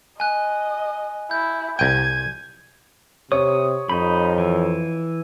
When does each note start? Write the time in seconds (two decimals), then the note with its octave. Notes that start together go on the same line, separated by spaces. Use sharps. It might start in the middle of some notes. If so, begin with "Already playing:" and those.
0.20 D#5 G#5 F#6
1.31 E4 G6
1.79 C2 G5 G6 G#6 D#7
3.32 C3 C#5 D#6
3.89 F2 D#4 B5
4.38 E3